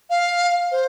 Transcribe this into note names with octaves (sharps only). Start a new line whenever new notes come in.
F5
C5